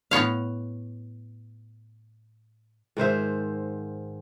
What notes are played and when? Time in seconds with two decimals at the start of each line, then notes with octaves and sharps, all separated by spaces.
0.11 A2 B3 C#5 F5
2.97 G#2 D#3 C5 E5